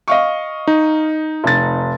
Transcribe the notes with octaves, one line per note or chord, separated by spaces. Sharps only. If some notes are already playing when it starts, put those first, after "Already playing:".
D#5 F5 C#6
D#4
F1 A6